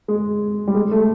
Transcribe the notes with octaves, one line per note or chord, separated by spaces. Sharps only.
G#3
G3
G#3
A3